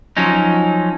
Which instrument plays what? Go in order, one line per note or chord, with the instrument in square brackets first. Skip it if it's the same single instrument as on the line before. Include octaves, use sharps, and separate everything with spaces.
[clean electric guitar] F3 F#3 C#4 D#4